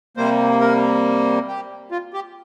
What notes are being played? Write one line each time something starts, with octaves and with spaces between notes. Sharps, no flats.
C3 G3 A#3 C5
A#4
G4
F4
G4